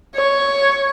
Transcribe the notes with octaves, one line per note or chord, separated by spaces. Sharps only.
C#5